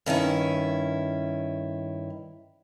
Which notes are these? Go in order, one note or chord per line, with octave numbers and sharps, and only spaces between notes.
G2 D#3 C#4 E4